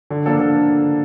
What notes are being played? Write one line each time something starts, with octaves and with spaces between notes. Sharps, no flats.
D3
F3 A#3 D4 A4
D3 A4